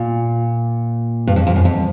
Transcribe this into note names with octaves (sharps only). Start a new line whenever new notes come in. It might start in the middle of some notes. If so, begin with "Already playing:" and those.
Already playing: A#2
G2
F2
F2
F#2
F2